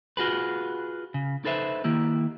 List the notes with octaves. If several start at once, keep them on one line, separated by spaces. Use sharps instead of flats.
F4 F#4 G#4 B4
C#3
D#4 A4 B4 C5 E5
D#3 A#3 E4 G4